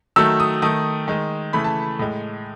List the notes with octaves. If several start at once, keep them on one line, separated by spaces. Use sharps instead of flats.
D#3 F#3 A3 E6
D#6
D#3 A3 D#6
D#3 G#3
C#3 E3 A3 B5
A5
A2 G#3